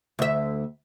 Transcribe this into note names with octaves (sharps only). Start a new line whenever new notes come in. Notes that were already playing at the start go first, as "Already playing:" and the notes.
D2 E5